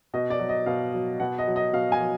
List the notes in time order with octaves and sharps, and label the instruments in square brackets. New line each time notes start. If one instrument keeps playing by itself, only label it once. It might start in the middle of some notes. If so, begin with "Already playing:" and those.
[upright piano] B2 D#5
D5
F#3
D#5
B2 F5
F#3
B2 F#5
D#5
F#3
D#5
B2 F5
G#5
F#3